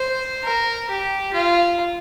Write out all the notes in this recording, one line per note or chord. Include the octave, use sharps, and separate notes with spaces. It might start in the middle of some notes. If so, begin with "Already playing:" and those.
Already playing: C5
A#4
G4
F4